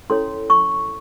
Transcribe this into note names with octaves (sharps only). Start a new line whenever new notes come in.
C#4 E4 A4 C#5 C6
C#6